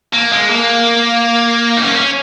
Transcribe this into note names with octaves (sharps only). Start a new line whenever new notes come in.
A#3
G#3
A#3
D#4
C#4
A#3
C#4